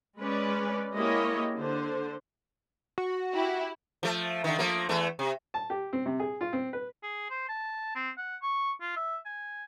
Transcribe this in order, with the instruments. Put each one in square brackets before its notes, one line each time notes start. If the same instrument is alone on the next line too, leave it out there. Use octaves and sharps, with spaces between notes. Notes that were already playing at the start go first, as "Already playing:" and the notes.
[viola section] G#3 C#4 B4 D5
G#3 A#3 E4 G4 C#5 D#5
D3 C5
[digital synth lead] F#4
[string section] E4 G4
[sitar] F3 A3
D3 D#3
F3 A3 A#3
E2 A3
C3
[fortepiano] A5
G4
C4
C3
G#4
F4
C4
B4
[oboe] G#4
C5
A5
C4
F#5
C#6
F4
E5
G#5